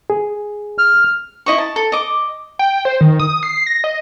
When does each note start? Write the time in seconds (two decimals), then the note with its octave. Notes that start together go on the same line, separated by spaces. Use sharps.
0.10 G#4
0.78 F6
1.46 E4 D#5 C#6
1.58 A5
1.76 A4
1.92 D#5 D6
2.59 G5
2.85 C5
3.01 D#3
3.20 D#6
3.43 C7
3.67 A#6
3.84 D#5